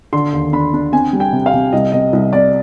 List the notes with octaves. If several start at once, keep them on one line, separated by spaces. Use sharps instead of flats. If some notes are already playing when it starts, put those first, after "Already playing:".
D3 C6
D#2
D4 B5
D4
C4 G#5
G3
G5
C3
F5
C3
C2 D#5
C3 D#5
C2 D#5
C3 D5